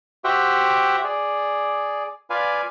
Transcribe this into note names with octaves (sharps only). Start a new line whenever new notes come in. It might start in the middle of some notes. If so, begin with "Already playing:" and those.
F#4 G4 C5 E5 F#5 G5
G#4 D5
F4 B4 D5 F5 G#5